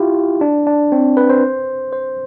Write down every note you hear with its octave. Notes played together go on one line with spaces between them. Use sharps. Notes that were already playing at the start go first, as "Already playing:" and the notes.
Already playing: E4 F4 G4
D4
D4
C4
B4
C5
C5